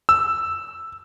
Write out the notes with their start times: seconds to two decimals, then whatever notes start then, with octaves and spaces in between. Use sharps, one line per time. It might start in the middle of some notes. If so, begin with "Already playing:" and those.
0.09 E6